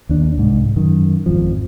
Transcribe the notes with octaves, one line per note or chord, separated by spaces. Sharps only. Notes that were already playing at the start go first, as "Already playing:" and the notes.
D#2 D4
C2 G#2
F#2 D#3
G#1 F2 F3